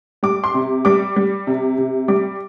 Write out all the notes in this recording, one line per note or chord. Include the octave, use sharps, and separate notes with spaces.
G3 D6
C6
C3
G3 D6
G3
C3
C3
G3 D6